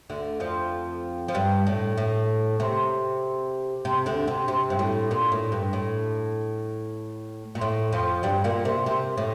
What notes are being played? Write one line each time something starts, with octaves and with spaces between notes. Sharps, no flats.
D2 D3
F2 F3
F3
G2 G3
A2
A2
C3
C3
D2 D3
C3
C3
G2
A2
A#2
A2
G2
A2
A#2
A2
F2 F3
G2 G3
A#2 A#3
C3
C3
A2